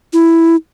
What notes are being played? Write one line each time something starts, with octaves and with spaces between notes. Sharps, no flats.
E4